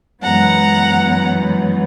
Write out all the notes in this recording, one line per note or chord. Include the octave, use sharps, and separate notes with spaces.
F#2 E3 G#3 B3 F#5 A#5